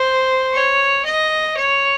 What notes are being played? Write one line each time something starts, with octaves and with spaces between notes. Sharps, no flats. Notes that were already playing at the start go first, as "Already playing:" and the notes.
Already playing: C5
C#5
D#5
C#5